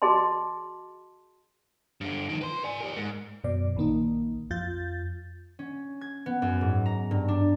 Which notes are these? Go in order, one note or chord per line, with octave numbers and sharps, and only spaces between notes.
F#4 G#4 D#5 A5 C6
G2 D3
D#3 F3
B4 C6
D5 G#5
G4 A#4
G#2
F#2 B2 D5
A#1 D#3 A#3 D#4
F2 F4 G6 A6
C#4
G#6
B3
F#2
G#2
A#5
G2
D4